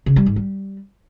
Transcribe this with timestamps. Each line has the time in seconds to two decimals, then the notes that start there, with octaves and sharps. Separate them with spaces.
0.06 C#3
0.16 G3
0.26 G#2
0.36 G3